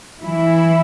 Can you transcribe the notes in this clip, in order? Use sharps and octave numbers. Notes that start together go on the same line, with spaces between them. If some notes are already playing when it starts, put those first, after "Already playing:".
E3 E4